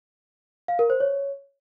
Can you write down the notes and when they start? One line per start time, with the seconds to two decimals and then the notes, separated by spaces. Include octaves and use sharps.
0.68 F5
0.79 A#4
0.90 C5
1.00 C#5